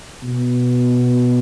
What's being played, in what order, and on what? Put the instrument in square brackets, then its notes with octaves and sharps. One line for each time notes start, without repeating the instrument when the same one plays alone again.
[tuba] B2